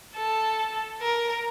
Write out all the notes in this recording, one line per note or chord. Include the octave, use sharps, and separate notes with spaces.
A4
A#4